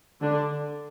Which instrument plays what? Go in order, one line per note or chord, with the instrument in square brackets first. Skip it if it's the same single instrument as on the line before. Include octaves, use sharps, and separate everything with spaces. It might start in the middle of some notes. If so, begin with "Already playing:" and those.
[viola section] D3 D4